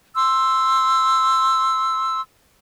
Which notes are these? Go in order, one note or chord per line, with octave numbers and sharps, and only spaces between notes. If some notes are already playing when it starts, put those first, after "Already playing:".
C6 E6